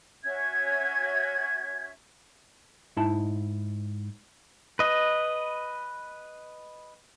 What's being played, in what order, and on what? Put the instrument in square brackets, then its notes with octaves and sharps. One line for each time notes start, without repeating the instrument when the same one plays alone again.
[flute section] C#4 F#4 E5 G#6
[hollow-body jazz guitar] G#2 D#4 E4 A5
[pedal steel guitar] B4 D#5